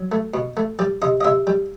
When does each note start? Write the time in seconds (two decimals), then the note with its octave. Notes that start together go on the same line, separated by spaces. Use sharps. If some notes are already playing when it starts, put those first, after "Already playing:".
Already playing: F#3
0.12 A3
0.34 B2
0.57 A3
0.79 G3 D5
1.02 C3 D#5
1.21 D#5
1.24 C3 E5
1.47 G3